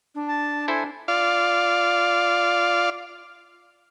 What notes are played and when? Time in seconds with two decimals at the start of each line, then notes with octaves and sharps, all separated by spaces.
0.15 D4
0.28 A5
0.68 E4 A4 C5 G#5
1.08 F4 D5 F5